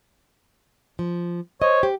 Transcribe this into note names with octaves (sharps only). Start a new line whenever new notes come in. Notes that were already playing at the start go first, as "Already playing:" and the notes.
F3
C5 C#5 D#5
G4